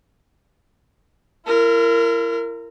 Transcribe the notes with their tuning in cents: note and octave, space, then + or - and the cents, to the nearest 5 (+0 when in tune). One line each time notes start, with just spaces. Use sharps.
E4 +45 A#4 -15